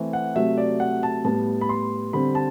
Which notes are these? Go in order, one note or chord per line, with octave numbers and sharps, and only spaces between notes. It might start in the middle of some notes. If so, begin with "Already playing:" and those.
Already playing: E3 A3 C4
F#5
C3 F#3 A3 E5
D5
F#5
A5
A2 G3 B3 A5
B5
C6
D3 G3 C4 B5
A5